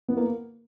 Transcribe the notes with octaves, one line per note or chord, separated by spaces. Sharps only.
B3
A#3